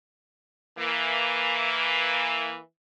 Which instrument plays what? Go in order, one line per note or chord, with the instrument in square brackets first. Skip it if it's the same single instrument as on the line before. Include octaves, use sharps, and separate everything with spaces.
[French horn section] E3 A#3